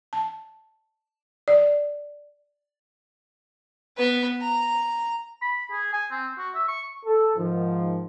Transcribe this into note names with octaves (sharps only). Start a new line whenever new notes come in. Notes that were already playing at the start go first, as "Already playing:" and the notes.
A5
D5
B3 B4
A#5
B5
G#4
G#5
C4
F#4
E5
C#6
A4
G#2 D#3 F3